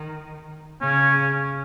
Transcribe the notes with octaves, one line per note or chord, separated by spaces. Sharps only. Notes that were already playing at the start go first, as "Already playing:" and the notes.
Already playing: D#3
C#3 C#4